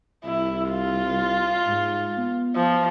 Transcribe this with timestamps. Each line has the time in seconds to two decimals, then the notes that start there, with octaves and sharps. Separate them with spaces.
0.25 C2 E4
0.70 F4
1.66 G#2
2.17 B3
2.55 F3